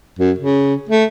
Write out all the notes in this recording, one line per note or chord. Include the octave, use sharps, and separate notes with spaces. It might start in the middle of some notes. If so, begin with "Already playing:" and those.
F#2
C#3
A3